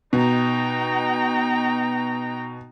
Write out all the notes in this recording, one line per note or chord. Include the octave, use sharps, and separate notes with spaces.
B2 D#4 G5 A#5